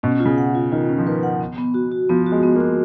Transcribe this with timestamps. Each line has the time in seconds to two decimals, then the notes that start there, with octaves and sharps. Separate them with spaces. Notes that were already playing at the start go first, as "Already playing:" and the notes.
0.03 B2 C#4
0.20 F4
0.25 C#3
0.38 F#5
0.55 F4
0.72 D#3 F4
0.89 C#4
0.98 F3
1.06 D#3 B4
1.23 F#5
1.41 B3
1.58 B3
1.74 F#4
1.92 F#4
2.10 F3 B3
2.27 F#4
2.32 G#3
2.43 B3
2.56 A#3
2.60 F#4